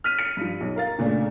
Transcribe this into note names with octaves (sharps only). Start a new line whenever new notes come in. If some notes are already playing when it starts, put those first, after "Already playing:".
F6 B6 D#7
C#7
G2 F3
B1
A#4 F5 A6
A#2 C#3 A3 D4